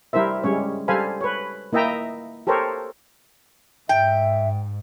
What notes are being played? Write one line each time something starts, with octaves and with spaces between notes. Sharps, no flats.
G3 E4 A#4 C5 E5
G3 G#3 C#4 C#5
G3 A4 C5 F5 G#5 B5
B4 C#5
A#3 E4 D#5 E5 G5 A#5
G4 A4 A#4 C5 C#5
G#2 E5 G5